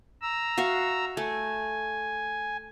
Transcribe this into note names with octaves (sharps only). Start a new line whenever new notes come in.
A#5 E6
F#4 E5 F5
A3 G#5